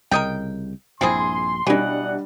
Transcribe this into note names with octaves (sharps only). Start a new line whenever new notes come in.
C2 C#3 A#4 D#5 G5
A#1 G2 A#2 C4 E4 G#4 C6
B2 E3 F#3 G3 D4 D#5 F#5